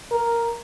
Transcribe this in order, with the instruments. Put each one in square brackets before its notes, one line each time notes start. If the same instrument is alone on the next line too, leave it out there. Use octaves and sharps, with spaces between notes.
[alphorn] A#4